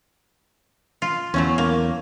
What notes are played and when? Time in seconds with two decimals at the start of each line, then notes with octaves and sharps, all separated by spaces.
1.02 F4
1.34 E2 F#3 A3 C#4
1.58 A#3